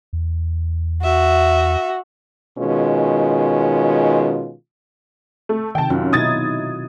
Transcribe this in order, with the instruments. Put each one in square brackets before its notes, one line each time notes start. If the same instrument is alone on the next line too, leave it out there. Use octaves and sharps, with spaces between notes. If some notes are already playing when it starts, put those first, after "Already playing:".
[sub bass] E2
[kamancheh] F#4 [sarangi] E5
[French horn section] B2 D#3 G#3 C#4 F4
[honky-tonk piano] A3
[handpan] C3 D#3 [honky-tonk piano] G5 A5
[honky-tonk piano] F#2 [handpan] F#3 F4
[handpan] B2 D#4 E4 [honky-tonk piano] D#6 G#6 A6